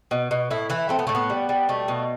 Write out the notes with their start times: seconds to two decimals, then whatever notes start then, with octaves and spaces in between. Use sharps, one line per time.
0.11 B2
0.31 B2
0.51 A2 E4
0.70 E3 E4
0.89 A3 C4
0.99 B3
1.07 A2 A3
1.15 B3
1.30 G3
1.49 G3
1.69 B2 A3
1.88 B2